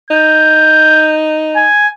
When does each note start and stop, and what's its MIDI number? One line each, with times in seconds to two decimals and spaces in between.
0.11 1.67 63
0.11 1.15 91
1.56 1.88 80